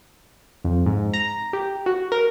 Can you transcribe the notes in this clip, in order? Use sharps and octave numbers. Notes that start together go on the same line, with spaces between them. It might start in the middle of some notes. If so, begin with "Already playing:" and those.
F2
G#2
A#5
G4
F#4
A#4